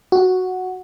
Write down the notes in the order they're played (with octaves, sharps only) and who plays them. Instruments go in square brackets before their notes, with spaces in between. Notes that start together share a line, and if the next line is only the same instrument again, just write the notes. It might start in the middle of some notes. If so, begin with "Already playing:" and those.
[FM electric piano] F#4